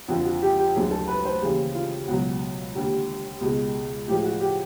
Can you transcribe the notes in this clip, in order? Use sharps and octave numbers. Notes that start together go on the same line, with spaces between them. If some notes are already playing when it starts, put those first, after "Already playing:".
F2 D3 F3 F#4
F#4
G4
G4
D2 D3 F#3 G#4
A4
B4
C5
D#2 C#3 E3 G3 G#4
F4
C#2 B2 F#3 F#4
D#2 D3 G3
C#2 B2 G#3
A2 F3 G#3 G4
F#4
G4